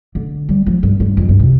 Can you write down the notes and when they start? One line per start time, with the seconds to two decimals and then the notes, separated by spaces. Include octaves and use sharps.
0.15 D3
0.49 G3
0.66 F3
0.83 G2
1.00 G2
1.17 F2
1.29 G2
1.39 C3